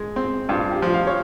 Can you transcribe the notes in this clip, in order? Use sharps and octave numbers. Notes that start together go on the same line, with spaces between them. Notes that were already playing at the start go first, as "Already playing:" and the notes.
Already playing: G#3
C4
G2 F4
G4
F3
F5
C#5